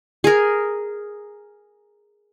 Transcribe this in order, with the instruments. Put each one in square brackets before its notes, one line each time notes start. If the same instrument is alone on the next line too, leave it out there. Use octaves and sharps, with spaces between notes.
[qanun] G#4 A#4